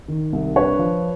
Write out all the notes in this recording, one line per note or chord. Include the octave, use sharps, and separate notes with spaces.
D#3
C2
D4 B4 C#5
F3